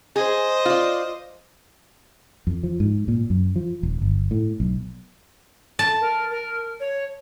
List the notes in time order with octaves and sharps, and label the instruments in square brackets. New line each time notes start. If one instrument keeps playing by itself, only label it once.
[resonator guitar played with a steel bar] G#4 [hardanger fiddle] C5 D#5
[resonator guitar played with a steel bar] F4 D5
[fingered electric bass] F2
F3
G#2
A#2
F#2
F3
D#1
G1
A2
B1
[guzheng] A5
[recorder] A#4
A#4
C#5